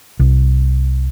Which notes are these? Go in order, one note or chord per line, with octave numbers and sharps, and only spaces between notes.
C2